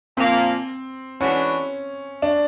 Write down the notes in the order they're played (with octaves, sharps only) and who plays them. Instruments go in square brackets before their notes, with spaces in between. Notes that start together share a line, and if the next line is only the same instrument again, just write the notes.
[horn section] A#2 F3 A#3 [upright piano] C4
[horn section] E3 G#3 B3 D4 F#4 [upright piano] C#4
[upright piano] D4